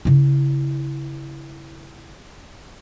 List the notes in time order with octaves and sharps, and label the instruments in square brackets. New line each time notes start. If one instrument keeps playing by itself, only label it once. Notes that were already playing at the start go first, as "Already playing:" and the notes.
[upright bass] C#3 E4